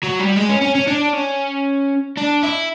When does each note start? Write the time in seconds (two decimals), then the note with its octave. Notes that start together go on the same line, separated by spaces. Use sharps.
0.03 F#3
0.19 G3
0.36 G#3
0.49 C#4
0.62 C#4
0.75 C#4
0.88 D4
1.13 C#4
2.17 D4
2.43 E4